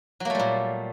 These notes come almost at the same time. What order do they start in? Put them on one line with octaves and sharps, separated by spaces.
F#3 A#3 A3 G3 A#2